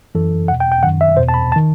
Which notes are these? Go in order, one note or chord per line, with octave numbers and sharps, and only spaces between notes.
F#2 E3 A4
E2 B2 F#5
G5
G5
F#2 D#3 F#5
E5
E2 B2 C5
A5
B5
A5
D#3